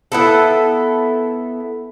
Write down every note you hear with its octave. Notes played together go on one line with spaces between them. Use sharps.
B3 E4 A4